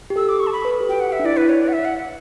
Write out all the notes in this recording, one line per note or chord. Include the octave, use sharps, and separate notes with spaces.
G4
A4 E6
D6
C#6
A5
B5
B4
A4
G4
F#4 G5
F#5
E5
D4
E4 D5
B4
C#5
D5
F#5
E5
F#5